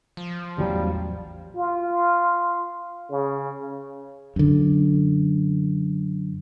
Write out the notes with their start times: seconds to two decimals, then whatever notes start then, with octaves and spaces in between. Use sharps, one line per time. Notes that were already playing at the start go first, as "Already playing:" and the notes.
0.17 F3
0.58 A1 E2 F#3 G3
1.56 F4
3.11 C#3
4.36 F#2 D3